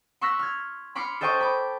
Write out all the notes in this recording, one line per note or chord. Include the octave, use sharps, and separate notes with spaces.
C6 C#6 E6 F#6 A#6 B6
F6 G#6
B5 C6 D6 F6 C7 C#7
A4 C5 D#5 G5 C#6 D6
B5 D6